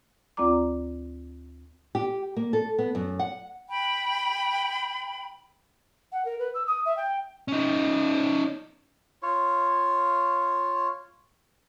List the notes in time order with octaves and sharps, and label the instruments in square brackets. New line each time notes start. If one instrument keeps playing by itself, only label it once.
[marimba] D2 C4 F4 D5 A#5 D6
[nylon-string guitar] G4
A#3
A4
B3
F#2
F#5
[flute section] G5 B5
[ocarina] F#5
A#4
B4
E6
D#6
E5
G5
[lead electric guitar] C#4 D#4
[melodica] F4 C#5